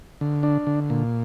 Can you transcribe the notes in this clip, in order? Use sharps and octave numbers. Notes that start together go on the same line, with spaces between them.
D3
D4
D3
A#2